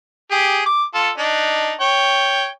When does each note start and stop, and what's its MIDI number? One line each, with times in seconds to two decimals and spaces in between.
0.31 0.63 67
0.31 0.63 68
0.66 0.83 86
0.94 1.10 65
0.94 1.10 69
1.18 1.72 62
1.18 1.72 63
1.81 2.48 73
1.81 2.48 79